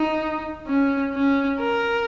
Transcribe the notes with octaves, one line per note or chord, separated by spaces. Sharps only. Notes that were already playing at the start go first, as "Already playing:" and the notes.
Already playing: D#4
C#4
C#4
A#4